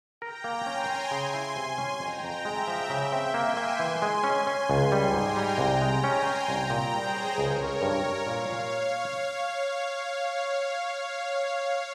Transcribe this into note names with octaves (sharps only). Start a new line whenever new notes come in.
A#4 G5 A#5
A#3
C#4 G#5 C6
C#4
C#3 G#5 C6
E4
C3 G#5 C6
C#4
F2 G5 A#5
F2
G#3 E5 G5
F3
C#3 E5 G5
C4
A#3 G#5 C6
A#3
E3 G#5 C6
G#3
C#4
C#4
C#2 G#5 C6
G3
G#2 G5 A#5
G3
C2 G5 A#5
G#3
C#4 G#5 C6
C#4
C2 G5 A#5
A#2
G3 G#4 C5
C#4
C#2 A#4 C#5
C#2
G2
G2
A#2 C#5 F5
A#2